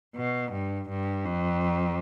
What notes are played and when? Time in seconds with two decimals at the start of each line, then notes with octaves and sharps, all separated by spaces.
0.16 B2
0.52 G2
0.89 G2
1.25 F2